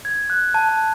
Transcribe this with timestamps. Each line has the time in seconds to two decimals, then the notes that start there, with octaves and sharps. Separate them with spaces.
0.05 G#6
0.30 F#6
0.54 A5
0.69 A5